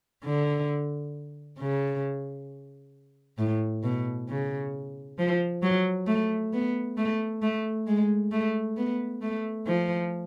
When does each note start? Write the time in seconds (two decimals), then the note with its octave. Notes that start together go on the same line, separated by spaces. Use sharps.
0.24 D3
1.59 C#3
3.38 A2
3.83 B2
4.28 C#3
5.18 F3
5.62 F#3
6.07 A3
6.53 B3
6.97 A3
7.42 A3
7.87 G#3
8.32 A3
8.77 B3
9.22 A3
9.67 F3